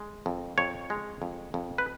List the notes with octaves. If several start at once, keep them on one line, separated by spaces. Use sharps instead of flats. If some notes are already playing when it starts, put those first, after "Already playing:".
Already playing: G#3
F2
F2 C#5
G#3
F2
F2
B4